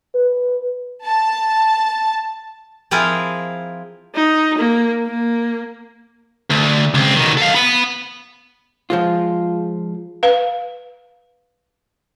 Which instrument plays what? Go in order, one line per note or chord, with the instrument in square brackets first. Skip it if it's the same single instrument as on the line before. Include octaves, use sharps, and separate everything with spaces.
[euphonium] B4
[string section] A5
[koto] F3 C4 E4 F4 G#4 A#4
[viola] D#4
A#3
A#3
[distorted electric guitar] D2
C#2 C4
B2 D#3
A4 F5
F#5 B5
[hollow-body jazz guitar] F3 G#3 F4
[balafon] B4 F5